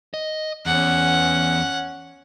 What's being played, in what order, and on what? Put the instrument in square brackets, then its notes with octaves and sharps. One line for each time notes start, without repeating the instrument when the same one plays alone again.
[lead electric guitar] D#5
[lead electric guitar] E2 [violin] C#4 F#5